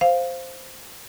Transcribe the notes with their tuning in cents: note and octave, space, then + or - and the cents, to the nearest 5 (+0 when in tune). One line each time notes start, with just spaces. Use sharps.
C5 +0 F5 +0